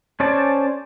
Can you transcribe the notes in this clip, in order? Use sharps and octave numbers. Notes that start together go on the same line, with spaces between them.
C#4 G#4 C5 D5 A5